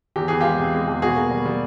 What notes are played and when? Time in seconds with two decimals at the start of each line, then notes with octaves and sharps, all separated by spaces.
0.16 E2 G4
0.28 E2 G#4
0.41 G#3 F4 G4
0.59 C3
0.74 G#3
0.88 E2
1.02 B2 F#4 G#4
1.16 A#3
1.31 G3
1.46 G3